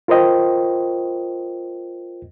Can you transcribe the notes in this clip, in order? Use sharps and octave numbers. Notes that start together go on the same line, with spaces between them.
F4 A#4 C5 D#5 G5